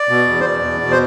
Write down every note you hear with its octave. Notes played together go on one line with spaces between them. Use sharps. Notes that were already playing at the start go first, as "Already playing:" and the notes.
Already playing: D5
B2
E2
C5
B2 D5
E2
B2
C5